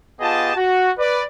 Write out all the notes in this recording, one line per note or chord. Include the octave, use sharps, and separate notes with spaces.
B3 F4 G4 G#4 D#5 A5
F#4
B4 D5